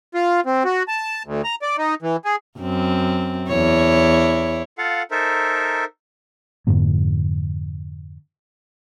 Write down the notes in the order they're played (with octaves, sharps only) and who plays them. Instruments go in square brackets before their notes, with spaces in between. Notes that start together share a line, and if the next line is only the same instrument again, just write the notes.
[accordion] F4
C4
F#4
A5
D2
A#5
D5
D#4
E3
G#4
[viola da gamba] F#2 C4
E2 E4 C#5
[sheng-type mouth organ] F4 A4 F5 F#5
D#4 A4 A#4 C5 E5
[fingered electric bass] F2 G#2 D3 A#3